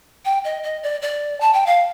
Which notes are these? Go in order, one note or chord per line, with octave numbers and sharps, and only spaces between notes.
G5
D#5
D#5
D5
D5
A5
G5
F5